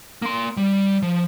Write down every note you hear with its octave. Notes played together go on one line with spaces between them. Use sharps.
A#3 C6
G3
F3